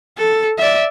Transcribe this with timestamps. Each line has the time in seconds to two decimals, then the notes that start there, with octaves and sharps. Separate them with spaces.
0.18 A4
0.59 D5 E5